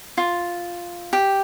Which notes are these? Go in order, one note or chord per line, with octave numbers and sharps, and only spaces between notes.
F4
G4